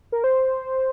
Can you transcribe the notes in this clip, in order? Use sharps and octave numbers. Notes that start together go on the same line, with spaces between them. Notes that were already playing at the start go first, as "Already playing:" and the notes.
A#4
C5